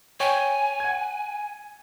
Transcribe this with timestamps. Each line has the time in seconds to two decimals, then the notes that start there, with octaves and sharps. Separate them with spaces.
0.20 C#5 G5 G#5 G#6
0.80 F#5 G#6